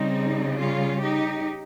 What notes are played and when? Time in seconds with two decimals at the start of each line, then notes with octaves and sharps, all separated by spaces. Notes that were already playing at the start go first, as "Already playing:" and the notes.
Already playing: C#3 G3 C4 D#4
0.60 C#4 F4
1.01 D#4 G4